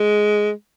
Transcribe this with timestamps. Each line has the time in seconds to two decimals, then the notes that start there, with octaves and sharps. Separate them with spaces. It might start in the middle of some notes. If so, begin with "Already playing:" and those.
Already playing: G#3